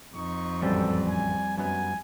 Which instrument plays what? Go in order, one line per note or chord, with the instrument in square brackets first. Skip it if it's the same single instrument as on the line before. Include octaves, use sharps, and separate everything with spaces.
[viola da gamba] F2 [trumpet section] D#4 C#6
[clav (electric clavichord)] A1 F#2 C4 [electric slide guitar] G3 [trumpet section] A4
[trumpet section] G#5
[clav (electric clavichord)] F#2 B3 [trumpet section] G#5